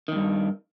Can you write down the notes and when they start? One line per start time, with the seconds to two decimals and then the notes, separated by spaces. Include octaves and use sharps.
0.08 D#3
0.12 E2
0.16 G2